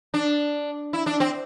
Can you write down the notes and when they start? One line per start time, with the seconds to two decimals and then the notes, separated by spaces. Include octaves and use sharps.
0.14 D4
0.93 E4
1.06 D4
1.20 C4